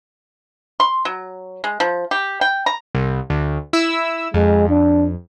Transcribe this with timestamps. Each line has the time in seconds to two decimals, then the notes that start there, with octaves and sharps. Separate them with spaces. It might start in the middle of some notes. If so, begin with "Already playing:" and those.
0.80 C6
1.05 F#3
1.64 G#3
1.80 F3
2.11 G4
2.41 G5
2.66 A#5
2.95 C2
3.30 D2
3.73 E4 E6
4.34 F2 G#3
4.69 D4